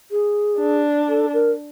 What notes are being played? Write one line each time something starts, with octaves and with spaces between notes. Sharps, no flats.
G#4
D4
A4
A#4